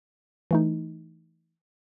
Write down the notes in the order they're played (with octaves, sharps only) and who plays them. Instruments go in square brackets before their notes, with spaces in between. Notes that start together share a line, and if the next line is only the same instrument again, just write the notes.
[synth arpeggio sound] E3 A3 D#4